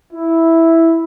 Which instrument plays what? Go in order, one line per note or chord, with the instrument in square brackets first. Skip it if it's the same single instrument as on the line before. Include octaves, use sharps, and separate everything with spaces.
[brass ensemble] E4